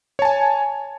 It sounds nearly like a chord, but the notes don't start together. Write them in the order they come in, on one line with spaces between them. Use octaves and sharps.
C#5 A5 G#5